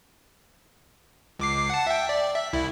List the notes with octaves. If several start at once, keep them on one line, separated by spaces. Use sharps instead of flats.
C#2 D6 C7
F#5 A5
E5 G5
D5
E5
C2 E4